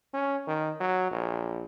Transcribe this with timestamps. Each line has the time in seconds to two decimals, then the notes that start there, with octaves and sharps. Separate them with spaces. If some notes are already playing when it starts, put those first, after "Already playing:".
0.13 C#4
0.47 D#3
0.81 F#3
1.11 A#1